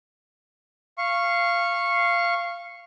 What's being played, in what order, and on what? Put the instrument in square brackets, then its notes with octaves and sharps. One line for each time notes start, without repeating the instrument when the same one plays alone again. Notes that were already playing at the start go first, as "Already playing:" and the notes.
[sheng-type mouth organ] F5 C#6